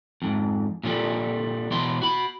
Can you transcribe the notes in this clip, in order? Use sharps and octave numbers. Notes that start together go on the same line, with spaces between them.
F2 G#2
A#2 D3 F3 G3
B2 E3 E4 C6
F#4 B5